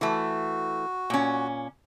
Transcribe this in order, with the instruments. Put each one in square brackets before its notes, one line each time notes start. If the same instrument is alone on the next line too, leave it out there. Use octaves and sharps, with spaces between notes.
[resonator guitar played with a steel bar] E3 A3 [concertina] F#4
[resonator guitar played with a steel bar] A#2 C#4